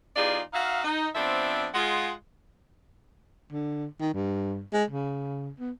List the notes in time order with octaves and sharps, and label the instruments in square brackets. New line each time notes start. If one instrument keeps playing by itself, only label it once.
[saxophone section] E2 D#4 F4 G4 G#4 D5
D#4 F#4 E5 F5
D#4
F3 B3 C4 D4 C5 E5
G#3 F4 F#5
[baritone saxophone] D3
D#3
G2
G#3
C#3
B3